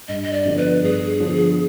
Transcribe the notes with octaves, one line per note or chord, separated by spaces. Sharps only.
G2 D#5
D#5
D5
D3 F3 B3
B4
G2 G#4
D3 F3 B3